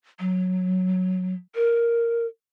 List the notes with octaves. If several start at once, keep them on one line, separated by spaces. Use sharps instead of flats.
F#3
A#4